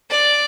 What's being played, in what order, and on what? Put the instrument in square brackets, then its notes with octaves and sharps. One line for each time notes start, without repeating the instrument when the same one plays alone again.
[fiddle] D5